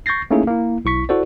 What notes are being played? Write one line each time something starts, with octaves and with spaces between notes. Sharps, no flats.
C#6 G6 A6 A#6 C7
A3 A#3 C#4 D#4 E4 G#4
A#3 E4
B1 E4 C#6 B6
E4 F#4 A4 C5 D5